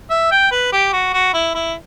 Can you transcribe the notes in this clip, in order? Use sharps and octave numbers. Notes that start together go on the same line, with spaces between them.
E5
G5
B4
G4
F#4
F#4
E4
E4